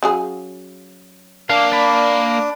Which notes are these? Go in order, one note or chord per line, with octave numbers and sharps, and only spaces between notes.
C#3 F#3 G#4
A#3 D4 F5
D5 B5